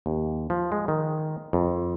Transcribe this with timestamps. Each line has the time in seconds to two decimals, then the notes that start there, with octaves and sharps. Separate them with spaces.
0.06 D#2
0.50 F3
0.72 G#3
0.88 D#3
1.53 F2